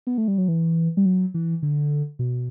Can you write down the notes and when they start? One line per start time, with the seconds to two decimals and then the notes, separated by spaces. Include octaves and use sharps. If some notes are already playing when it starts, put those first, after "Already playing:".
0.07 B3
0.18 A3
0.28 G3
0.38 F#3
0.48 E3
0.97 G3
1.05 F#3
1.34 E3
1.62 D3
2.19 B2